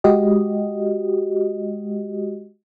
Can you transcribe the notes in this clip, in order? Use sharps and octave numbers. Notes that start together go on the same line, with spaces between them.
G#3 F#4 G4 D#5